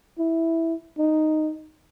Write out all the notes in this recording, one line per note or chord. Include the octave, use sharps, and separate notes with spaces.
E4
D#4